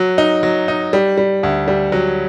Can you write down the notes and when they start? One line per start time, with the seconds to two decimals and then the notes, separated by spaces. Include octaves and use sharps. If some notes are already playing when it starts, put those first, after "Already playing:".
Already playing: F#3
0.18 D#4
0.43 F#3
0.68 D#4
0.93 G3
1.18 G3
1.43 D2
1.68 G3
1.92 F#3